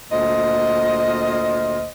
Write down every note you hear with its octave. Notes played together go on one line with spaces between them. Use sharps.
D2 A#2 C5 D#5